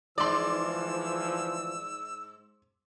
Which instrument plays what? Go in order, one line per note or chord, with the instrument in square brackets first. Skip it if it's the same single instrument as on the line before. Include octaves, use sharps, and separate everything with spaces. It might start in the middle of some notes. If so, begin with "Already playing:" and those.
[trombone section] D2 E3 F3 [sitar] G#2 D5 [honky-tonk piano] C6 D6 [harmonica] E6